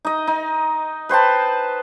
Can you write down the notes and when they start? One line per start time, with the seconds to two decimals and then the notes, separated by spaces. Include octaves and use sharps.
0.05 D#4 D#5
0.27 D#4
1.09 B4 C5 G5 A5